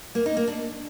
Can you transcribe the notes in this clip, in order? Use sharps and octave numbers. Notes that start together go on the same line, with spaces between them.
A#3
D#4
A#3
D4